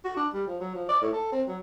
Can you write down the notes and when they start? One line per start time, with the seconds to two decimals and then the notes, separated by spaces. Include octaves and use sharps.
0.04 F#4
0.16 D4
0.33 G3
0.47 F3
0.60 F#3
0.75 F3
0.89 D5
1.01 A2
1.13 A4
1.32 C4
1.48 F#3